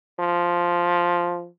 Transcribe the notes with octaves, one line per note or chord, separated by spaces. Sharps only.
F3